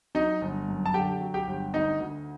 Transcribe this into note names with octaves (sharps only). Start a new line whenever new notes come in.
F#3 D#4 D#5
G1
F#2
A5
D3 G4 G5
F#3
G4 G5
G1
D2 D#4 D#5
D2